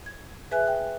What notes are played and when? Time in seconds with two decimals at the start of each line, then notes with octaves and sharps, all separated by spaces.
0.06 G#6
0.51 G#4 B4 E5 G#5 F#6
0.68 G5